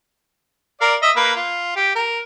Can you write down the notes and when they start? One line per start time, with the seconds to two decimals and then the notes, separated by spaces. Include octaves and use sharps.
0.81 A#4 D5 F5
1.02 D#5 E5
1.16 A#3 B4
1.36 F4
1.76 G4
1.95 A#4